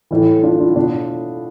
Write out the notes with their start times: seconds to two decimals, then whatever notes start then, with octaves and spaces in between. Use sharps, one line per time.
0.11 A2 E3
0.43 D4 F4
0.59 D4 F4
0.76 B2 D4 F4